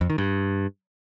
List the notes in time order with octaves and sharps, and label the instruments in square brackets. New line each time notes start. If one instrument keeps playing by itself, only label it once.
[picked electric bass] F2
D#3
G2